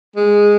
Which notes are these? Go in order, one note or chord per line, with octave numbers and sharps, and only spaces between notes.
G#3